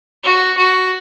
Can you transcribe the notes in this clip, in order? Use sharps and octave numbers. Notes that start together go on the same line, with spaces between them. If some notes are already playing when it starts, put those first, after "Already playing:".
F#4
F#4